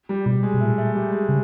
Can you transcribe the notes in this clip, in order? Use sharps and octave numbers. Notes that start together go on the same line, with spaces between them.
G3
B2 G3
G#3
B2
A#2 A3
A3
G3
G#3
C#3